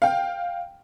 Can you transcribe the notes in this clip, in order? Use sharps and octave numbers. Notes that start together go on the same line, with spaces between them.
F5 G5